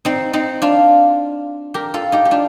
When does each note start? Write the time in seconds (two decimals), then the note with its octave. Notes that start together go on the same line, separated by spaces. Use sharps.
0.05 C4 D#4
0.33 C4 D#4
0.62 D4 F4
1.74 G4 A#4
1.94 F4 A4
2.12 D#4 G4
2.25 G4
2.31 D4 F4